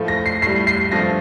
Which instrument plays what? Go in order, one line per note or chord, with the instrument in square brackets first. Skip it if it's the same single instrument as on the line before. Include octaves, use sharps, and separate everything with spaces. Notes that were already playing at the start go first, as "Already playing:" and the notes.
Already playing: [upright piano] A2 F3 A3
A#6
C7
A2 G3 C7
C7
G2 F3 A3 A#6